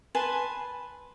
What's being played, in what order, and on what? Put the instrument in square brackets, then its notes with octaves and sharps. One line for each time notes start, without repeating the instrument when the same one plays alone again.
[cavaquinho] B4 G#5 A5 C6